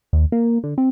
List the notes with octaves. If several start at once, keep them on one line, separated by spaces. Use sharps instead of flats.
D#2
A#3
D3
C4